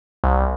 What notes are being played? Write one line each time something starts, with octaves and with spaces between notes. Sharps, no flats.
C2